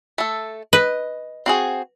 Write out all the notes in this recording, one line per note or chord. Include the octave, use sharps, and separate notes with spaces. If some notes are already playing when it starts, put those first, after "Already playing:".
A3 A4
B4 D#5
C4 F#4 G#4